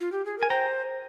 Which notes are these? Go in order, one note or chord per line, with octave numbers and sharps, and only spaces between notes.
F4
G4
G#4
A#4 G#5
C5 G5 A#5